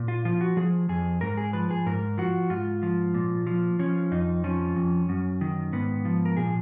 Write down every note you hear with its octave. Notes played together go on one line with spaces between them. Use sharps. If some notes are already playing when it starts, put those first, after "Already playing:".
Already playing: A#2
F4
F3 F4
F#4
F3 G#4
F2 G#4
G#2 A#4
G#4
F3 B4
G#4
G#2 A#4
F3 F#4
G#2 F4
F3
A#2
F3
F3 C#4
F2 D#4
F3 C#4
F2
F#2
D#3
G#2 B3
F3
A#4
A#2 G#4